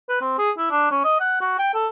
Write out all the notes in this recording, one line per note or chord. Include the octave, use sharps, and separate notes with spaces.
B4
C4
G#4
E4
D4
C#4
D#5
F#5
F#4
G5
A4